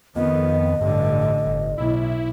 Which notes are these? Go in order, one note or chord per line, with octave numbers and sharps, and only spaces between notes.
F2 D#3 B3 D#5
A1 G2 D3
G1
B1 E4